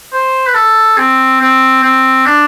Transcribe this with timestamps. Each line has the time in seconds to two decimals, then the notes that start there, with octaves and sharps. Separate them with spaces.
0.13 C5
0.47 B4
0.55 A4
0.98 C4
1.41 C4
1.83 C4
2.26 D4